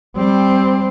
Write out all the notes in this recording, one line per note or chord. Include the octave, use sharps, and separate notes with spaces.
G3 C4